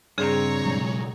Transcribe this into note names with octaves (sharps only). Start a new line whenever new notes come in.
G2 C#3 C4 G#4 C#5 A#5
B2 F#3 G#3